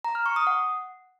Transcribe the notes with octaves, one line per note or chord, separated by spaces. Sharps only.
A#5
F6
C#6
D#6
F#5